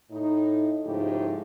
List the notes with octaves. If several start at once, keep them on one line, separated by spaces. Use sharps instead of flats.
A2 D#4
G#2 C#3 F3 A3 E4 G4